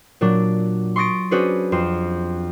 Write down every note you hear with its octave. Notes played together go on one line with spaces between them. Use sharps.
A#2 F#3 D4
C6 C#6 D#6 A6 A#6 D7
C#4 D4 F#4 G#4 B4 C5
F2 C6 C7 E7